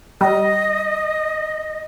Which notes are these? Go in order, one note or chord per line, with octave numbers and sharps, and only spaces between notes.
G3 D#5